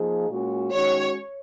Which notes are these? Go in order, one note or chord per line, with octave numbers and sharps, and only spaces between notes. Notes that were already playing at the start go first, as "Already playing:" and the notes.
Already playing: F3 A#3 D#4 G#4
A#2 G#3 C#4 F#4
D#3 G#3 C#4 F#4 C#5